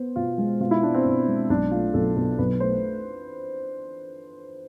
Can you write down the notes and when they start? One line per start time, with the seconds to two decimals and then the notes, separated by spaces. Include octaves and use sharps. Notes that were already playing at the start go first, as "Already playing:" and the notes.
Already playing: B3 C5
0.16 B2 F4
0.38 G#3
0.60 B2 F4
0.71 E4
0.82 B3 D4
0.94 C4
1.06 B2
1.27 G#3
1.50 B1 D4
1.71 A3 F4
1.94 B1 A4
2.17 B2 A4
2.39 B1 B4
2.60 A3 C5